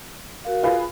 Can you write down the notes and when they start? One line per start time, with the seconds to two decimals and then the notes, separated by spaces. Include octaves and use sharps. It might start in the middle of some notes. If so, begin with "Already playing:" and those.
0.45 F#4 A#4 F5
0.63 F4 G#4 B4